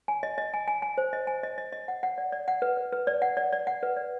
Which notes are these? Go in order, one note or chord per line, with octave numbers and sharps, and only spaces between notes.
G#5
D#5
D#5
G#5
G#5
G#5
C5
D#5
G#5
D#5
D#5
D#5
F#5
F#5
D5
D5
F#5
B4
B4
B4
D5
F#5
D5
D5
F#5
B4
D5